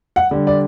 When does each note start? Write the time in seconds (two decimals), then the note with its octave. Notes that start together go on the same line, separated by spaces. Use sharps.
0.16 F#5
0.31 D3 G3
0.47 D5